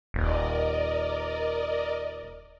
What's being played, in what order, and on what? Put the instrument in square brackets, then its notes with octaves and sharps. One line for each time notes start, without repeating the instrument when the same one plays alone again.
[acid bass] D#1 [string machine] A#4 D5 D#5